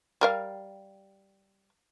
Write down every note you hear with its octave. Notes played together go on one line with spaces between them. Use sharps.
G3 A#4 F5